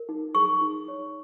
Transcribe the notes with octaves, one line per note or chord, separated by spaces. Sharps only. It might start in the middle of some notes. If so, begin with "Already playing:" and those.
Already playing: A#4
D#4
G#4 C#6
D#4
C#5